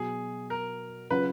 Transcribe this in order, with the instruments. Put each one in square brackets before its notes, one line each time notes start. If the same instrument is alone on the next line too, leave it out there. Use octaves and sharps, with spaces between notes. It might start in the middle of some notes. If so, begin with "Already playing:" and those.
Already playing: [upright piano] B2 F#3 B3 F#4 [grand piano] G#4
[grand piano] A#4
[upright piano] C#3 F#3 C#4 F4 [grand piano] B4